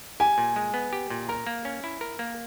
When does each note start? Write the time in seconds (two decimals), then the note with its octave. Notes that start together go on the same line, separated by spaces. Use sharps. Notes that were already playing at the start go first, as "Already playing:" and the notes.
0.20 G4 G#5
0.38 A#2
0.56 G#3
0.74 B3
0.93 G4
1.10 A#2
1.28 A#4 A#5
1.47 A#3
1.65 C#4
1.84 E4
2.01 A#4
2.19 A#3